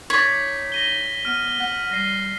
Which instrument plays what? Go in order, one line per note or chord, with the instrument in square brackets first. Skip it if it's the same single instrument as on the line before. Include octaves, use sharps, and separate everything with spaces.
[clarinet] D#4 [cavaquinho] C#5 D5 [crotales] B6
[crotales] A#6 D#7 G7
[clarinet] B3 [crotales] F6 D#7
[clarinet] F#5
[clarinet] G3 [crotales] A#6 C7 D#7